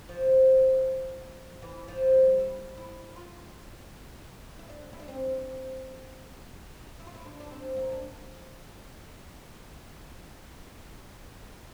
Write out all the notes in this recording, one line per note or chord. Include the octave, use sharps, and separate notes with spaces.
F3
E3
F3
G3
E4
E4
F4
E4
D4
E4
D4
C4
E4
F4
E4
D4
D4
C4
A#3
D4